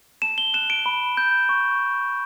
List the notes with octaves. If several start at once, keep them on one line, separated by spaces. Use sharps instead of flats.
A5 E7
G7
F#6 E7
D7
B5
G6
C#6